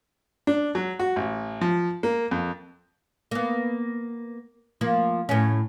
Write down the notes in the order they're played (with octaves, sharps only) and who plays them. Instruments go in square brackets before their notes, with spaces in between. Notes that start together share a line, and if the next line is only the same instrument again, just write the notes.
[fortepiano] D4
F#3
F#4
A1
F3
A#3
F2
[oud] A#3 B3
F3 A#3
A2 C#4